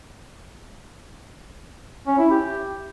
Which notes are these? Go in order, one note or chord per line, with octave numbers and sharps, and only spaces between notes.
C#4
E4
G4